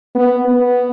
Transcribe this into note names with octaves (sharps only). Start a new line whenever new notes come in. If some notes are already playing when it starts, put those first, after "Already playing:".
B3
B3